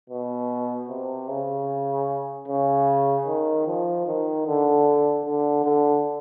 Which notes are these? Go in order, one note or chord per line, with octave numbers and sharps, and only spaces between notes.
B2
C3
C#3
C#3
D#3
F3
D#3
D3
D3
D3